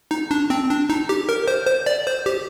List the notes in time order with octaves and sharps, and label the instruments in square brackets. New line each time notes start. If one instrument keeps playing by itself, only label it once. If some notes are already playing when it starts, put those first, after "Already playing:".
[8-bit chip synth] D#4
D4
C4
D4
D#4
G4
A#4
C5
C5
D5
C5
G4